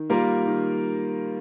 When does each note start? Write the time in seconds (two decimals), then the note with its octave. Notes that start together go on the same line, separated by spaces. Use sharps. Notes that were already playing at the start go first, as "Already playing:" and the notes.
Already playing: D#3
0.10 G3 A#3 F4 A#4
0.47 D#3